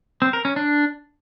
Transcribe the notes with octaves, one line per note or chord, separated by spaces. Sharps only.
C4
A#4
C#4
D4